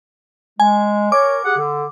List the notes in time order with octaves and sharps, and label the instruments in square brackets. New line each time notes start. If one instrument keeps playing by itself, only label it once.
[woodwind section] G#3 [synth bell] G#5
[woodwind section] A#4 C#5 [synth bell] D6
[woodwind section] G4 G#4 F#5
D3